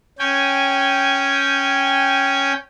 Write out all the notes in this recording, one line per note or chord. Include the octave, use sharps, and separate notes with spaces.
C#4 G5 G#5